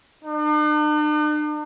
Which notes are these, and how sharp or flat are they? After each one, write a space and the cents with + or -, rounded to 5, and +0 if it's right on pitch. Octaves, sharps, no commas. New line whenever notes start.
D4 +45